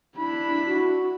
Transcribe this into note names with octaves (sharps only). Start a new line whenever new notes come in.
D4 E4 B5
F#4